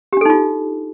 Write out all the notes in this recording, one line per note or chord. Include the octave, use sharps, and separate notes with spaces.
D4 D#4 F4 G4 A4